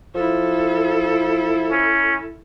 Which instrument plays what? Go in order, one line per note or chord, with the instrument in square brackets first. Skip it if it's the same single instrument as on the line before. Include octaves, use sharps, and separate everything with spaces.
[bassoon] F3 [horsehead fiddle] E4 A4
[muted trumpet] C#4